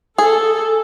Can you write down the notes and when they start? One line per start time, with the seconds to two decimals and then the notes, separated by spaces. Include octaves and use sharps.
0.18 G#4 A4